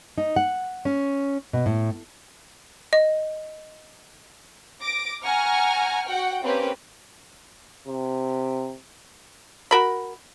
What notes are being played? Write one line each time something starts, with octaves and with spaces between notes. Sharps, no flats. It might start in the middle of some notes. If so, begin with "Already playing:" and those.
D#4
F#5
C#4
B2
A2
D#5
D6 A#6 D7
F#5 G#5 A#5 C#6 F6
F#4 F#5 G5
A#3 C4 C#4 G4 B4
C3
F#4 A#4 B5